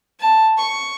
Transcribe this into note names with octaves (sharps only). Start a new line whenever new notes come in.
A5
C#6